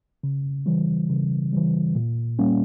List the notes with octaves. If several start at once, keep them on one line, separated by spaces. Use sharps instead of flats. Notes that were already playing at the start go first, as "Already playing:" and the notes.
C#3
E3 G3
C#3
E3 G3
A#2
G3 A#3 C#4